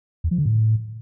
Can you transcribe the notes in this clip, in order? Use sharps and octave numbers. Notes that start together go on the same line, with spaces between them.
E2
F3
D3
A2